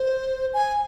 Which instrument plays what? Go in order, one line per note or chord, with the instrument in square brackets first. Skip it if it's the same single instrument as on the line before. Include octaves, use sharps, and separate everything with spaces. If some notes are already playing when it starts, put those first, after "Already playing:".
Already playing: [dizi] C5
G#5